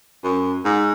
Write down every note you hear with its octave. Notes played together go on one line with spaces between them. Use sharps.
F#2
G#2